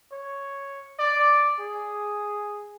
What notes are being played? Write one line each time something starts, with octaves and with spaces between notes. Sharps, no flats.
C#5
D5
G#4